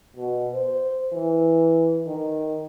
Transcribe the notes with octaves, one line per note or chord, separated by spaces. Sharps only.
B2
C5
E3
D#3